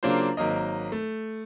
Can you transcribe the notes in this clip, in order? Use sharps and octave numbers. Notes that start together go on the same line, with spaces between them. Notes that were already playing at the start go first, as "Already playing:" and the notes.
C#3 F#3 A#3 D4 F4 C5
G#1 F#3 A#3 A#4 D#5
A3